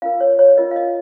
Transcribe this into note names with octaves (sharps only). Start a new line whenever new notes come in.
C#4 F4 A#4 F5
C#5
C#5
C#4 F4 A#4 D#5
F5
D#5